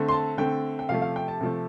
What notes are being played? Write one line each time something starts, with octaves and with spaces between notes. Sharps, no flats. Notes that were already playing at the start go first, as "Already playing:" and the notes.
Already playing: D3 A3 C4
C6
A5
D3 A3 C4 G5
G5
C3 F3 A3 F5
F5
G5
A5
C3 F3 A3